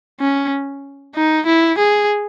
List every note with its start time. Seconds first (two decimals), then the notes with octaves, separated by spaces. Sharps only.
0.20 C#4
1.15 D#4
1.46 E4
1.78 G#4